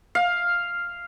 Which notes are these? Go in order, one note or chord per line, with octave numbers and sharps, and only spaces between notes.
F5